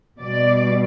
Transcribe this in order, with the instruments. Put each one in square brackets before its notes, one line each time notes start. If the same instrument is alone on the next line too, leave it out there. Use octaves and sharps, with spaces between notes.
[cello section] B2 G3 D5